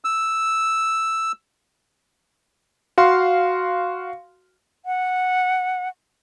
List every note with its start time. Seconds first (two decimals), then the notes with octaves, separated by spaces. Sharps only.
0.05 E6
2.98 F#4 F5 C6
4.85 F#5